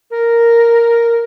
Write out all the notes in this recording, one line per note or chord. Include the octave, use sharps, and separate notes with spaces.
A#4